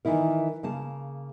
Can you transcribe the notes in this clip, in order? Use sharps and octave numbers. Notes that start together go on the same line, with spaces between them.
D#3 E3 D#4 E4 A#4
C#3 A#3 A5